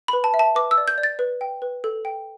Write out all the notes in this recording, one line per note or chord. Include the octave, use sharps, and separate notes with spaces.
B4 B5
A5
E5
A5
B4 D6
E6
D5
G6
D5
A6
B4
G5
B4
A4
G5